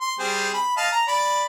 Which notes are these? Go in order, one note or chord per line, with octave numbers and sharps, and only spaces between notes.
C6
G3 C4 G#4
B5
D#5 F5 A5
A#5
D5 B5